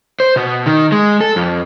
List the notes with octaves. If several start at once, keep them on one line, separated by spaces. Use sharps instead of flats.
C5
B2
D#3
G#3
A4
F2